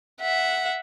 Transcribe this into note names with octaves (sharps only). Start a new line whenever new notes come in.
E5 F#5